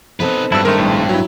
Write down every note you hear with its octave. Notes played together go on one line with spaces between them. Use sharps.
B3 C4 D#4 A4 B4
G2 F#3 G3 E4 A5 E6
D#3 G#3 A3 A#4
A#1 A2
F#3 E4